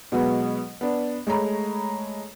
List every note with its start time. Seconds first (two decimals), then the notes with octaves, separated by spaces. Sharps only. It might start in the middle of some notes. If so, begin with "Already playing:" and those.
0.12 B2 F#3 G#3 B3
0.81 B3 D4
1.27 G#3 A3 C#5 A#5 B5